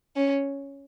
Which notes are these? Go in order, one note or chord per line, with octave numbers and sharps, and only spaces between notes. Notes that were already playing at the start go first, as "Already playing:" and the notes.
C#4